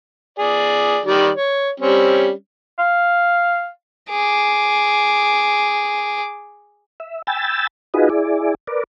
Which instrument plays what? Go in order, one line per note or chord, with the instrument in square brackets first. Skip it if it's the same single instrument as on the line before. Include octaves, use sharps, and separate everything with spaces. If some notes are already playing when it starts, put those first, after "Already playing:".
[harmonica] G#4 D5
D#3 G3 D5
C#5
G3 C4 C#4
[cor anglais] F5
[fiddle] G#4 D6
[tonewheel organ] E5
G5 G#5 B5 E6 A6
D#4 F4 F#4 G#4 B4 D#5
E4 G#4 D5
A#4 B4 D5